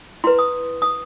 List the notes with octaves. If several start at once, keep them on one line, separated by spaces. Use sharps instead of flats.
E4 B4 C6
D#6
D#6